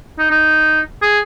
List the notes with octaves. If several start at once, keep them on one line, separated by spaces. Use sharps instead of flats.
D#4
D#4
G#4